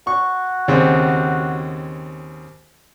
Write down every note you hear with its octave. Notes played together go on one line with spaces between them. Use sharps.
F#4 C#6
D#2 C#3 C4